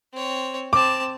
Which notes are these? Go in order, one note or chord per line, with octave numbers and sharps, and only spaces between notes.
C4 C#5
C4 A5 D6